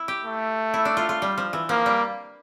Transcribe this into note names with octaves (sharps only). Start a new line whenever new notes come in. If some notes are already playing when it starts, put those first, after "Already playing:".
Already playing: E4
G4
A3
E4
D4
F4
F4
G3
F3
E3
F3 A#3
G3